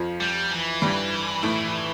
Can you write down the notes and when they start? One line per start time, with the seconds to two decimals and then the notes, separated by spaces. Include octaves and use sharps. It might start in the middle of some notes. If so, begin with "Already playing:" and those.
Already playing: F2 F3
0.21 G3
0.51 E3
0.82 G2 G3
1.43 A2 A3